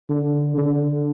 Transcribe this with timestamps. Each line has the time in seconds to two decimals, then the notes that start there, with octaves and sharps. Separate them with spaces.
0.09 D3
0.58 D3